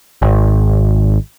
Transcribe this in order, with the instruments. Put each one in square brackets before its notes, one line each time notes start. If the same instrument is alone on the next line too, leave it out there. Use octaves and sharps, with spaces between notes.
[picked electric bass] G#1